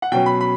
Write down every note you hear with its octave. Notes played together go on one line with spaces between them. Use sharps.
F#5
B2 F#3 C#4 G5
B5
B5